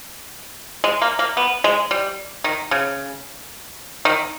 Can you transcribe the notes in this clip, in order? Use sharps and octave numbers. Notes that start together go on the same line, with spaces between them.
G#3
A#3
A#3
B3
G#3
G3
D#3
C#3
D#3